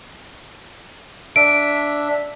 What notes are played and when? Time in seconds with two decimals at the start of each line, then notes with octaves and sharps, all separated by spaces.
1.36 D4 E5 D7